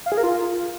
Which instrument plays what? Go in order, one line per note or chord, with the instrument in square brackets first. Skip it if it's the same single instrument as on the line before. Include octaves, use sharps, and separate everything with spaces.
[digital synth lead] F5
G#4
A#4
F4